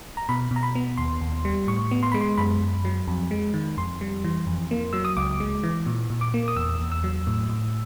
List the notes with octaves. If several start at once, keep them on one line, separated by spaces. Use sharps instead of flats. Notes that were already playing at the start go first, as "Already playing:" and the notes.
A#5
B2 B5
B2
A#5
B5
B3
D#2 C6
D#2
G3
A2 C#6
B3
C6
G#3 B5
C6
F#2 B5
F#2
F#3
F2
G#3
D#3
F2 C6
G3
E3
F2
A#3
F#3 E6
D#6
C#2 D6
G#3
E3
A#2
A#2
D6
A#3
D#6
E2 E6
E2
E6
F#3
A2
A2